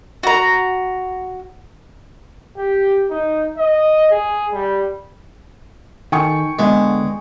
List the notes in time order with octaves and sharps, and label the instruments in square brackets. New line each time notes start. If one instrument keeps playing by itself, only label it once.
[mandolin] F#4 A#5
[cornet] G4
D#4
D#5
G#4
G3
[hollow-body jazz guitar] D#3 A4 [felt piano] G5 G#5 C#6
[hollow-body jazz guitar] D3 B3 [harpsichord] G#3